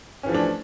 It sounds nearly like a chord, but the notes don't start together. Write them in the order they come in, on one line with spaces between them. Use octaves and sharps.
C#4 E3 F3 A3 D4